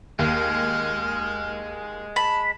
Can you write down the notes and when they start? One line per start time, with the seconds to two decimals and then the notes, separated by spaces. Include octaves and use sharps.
0.19 D#2 G#3 F6
2.16 A5 B5